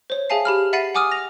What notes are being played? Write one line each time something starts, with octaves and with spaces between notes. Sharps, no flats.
C5 C#5
G#4 E5 F5 G#5 A5 C7
G4 B5 F6
E5 F#5 B5 A6 C7 D#7
F#5 G#5 D6 D#6 F6 D#7
A#6 F7